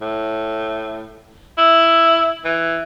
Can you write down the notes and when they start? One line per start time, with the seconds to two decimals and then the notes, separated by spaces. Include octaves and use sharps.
0.01 A2
1.58 E4
2.45 E3